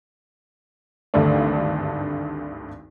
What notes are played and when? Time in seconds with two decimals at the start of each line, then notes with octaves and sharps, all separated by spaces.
1.14 G#1 D2 G2 A3 D4